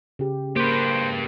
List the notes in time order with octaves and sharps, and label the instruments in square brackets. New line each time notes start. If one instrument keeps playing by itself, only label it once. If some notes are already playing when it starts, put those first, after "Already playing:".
[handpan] C#3 G4
[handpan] A#3 [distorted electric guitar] G4 B4 [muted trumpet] C5